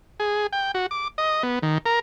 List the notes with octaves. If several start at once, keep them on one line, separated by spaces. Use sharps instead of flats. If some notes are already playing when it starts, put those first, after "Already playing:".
G#4
G5
F#4
D6
D#5
B3
D#3
A#4